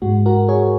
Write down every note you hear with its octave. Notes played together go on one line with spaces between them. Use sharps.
G#2 G#3 F#4
F#4 A#4
G#4 C#5